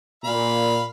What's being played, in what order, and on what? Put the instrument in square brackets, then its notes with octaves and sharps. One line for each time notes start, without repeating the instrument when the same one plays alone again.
[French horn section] A#2 [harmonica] F5 B5